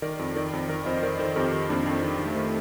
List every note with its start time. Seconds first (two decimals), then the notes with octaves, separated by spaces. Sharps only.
0.02 D#3 A#4 D5
0.19 F2
0.36 D#3 A#4 D5
0.53 F2
0.69 D#3 A#4 D5
0.86 F2 C5 D#5
0.98 C5
1.02 D#3 A#4 D5
1.19 D#3 A4 C5
1.36 F2 G4 A#4
1.53 D#3
1.69 F2 A#3 D4
1.86 F2
2.03 D#3
2.19 D#3
2.26 A3
2.36 D#3